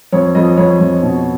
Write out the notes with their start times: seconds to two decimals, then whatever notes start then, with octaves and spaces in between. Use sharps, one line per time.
0.12 F2 C#5
0.35 F2 D#5
0.57 F2 C#5
0.80 F2
1.03 B2